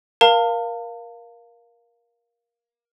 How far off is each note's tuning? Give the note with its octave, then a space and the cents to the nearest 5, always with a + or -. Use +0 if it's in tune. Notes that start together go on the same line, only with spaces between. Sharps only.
A#4 +20 F5 +0 A5 +45